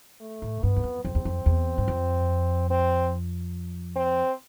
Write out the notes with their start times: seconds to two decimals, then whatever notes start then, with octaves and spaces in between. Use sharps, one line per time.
0.21 A3
0.42 A2
0.63 G2 B3
0.76 E2
0.84 F2
1.05 F2 C4
1.15 E2
1.25 F2
1.46 E2
1.78 G2
1.88 F2
2.70 C4
3.96 C4